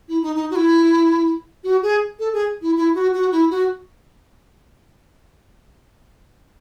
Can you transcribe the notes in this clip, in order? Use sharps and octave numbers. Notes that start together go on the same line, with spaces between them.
E4
D#4
D#4
F#4
E4
F#4
G#4
A4
G#4
E4
E4
F#4
F#4
E4
F#4